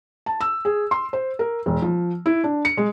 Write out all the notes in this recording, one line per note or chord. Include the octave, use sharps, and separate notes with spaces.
A5
E6
G#4
C6
C5
A#4
E1
F3
E4
D4
C#7
G#3